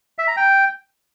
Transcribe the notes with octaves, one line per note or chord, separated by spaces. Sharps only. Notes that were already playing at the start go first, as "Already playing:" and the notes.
E5
A#5
G5